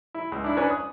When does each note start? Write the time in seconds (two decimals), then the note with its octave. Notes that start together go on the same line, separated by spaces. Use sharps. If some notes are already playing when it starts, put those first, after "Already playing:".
0.14 E4
0.32 C#2
0.44 D4 E4
0.57 C#4 D4 B4 G#5
0.70 D#6